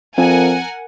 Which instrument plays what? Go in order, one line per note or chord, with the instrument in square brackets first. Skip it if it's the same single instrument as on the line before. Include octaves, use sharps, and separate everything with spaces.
[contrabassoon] F2 [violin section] A#4 F#5 G#5